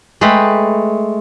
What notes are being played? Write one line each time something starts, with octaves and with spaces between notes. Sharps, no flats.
G#3 A3 A4 B4 G5 B5